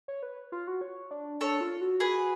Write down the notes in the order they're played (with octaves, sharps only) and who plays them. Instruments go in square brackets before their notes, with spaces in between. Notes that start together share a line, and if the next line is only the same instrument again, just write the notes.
[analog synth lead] C#5
B4
F4
F#4
C#5
D4
[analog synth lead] D4 [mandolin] A4 C#5
[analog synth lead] F4
F#4
[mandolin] G#4 B4